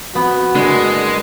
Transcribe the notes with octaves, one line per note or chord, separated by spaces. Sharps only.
F2 B3 F#4
F#1 D3 G#3